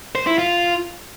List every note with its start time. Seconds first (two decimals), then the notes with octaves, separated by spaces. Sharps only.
0.15 C5
0.27 E4
0.38 F4